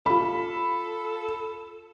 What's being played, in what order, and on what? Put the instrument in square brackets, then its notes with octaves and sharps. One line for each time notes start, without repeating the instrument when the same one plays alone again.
[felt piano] F4 B5 [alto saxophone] A4